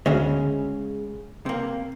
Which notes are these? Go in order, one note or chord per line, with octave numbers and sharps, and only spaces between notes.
D2 C#3 G#3 C#4
C3 A#3